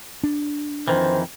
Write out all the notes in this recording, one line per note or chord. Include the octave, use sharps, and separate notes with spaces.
D4
F2 D#3 E3 C5